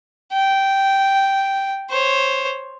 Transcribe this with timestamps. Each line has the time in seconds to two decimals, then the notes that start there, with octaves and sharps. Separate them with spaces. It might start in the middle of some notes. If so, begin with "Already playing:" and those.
0.33 G5
1.90 C5 C#5